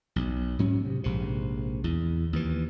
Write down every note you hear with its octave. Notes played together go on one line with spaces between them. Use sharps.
B1
G#2 F#3 C#4
C3
A#1 G#2 C3
E2
D#2 E3